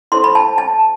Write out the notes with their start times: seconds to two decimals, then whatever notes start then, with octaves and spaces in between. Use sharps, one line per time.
0.12 E4 A4 C5 C6
0.24 B5
0.35 A5
0.58 A5